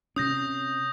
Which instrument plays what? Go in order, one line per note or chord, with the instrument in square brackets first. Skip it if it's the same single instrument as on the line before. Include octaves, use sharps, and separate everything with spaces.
[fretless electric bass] C3 C#4 [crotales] D#6 G6 A#6